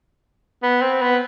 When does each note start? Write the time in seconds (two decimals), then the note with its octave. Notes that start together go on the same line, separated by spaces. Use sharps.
0.63 B3
0.82 C4
1.02 B3